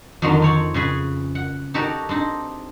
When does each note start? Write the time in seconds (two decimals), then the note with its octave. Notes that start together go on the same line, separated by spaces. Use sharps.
0.22 F2 D3 D#3 F#3 F5 C6
0.42 C4 C#5 D5
0.74 C#3 C#4 G#4 B4
1.35 F#5
1.74 D#4 F#4 G4 A4 A#4 D5
2.09 C4 D4 D#4